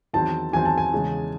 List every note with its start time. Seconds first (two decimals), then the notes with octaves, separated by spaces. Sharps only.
0.13 E2 D#3 F#3 C4 A5
0.53 E2 D#3 F#3 C4 G#5
0.65 A5
0.78 G#5
0.93 E2 C#3 G#3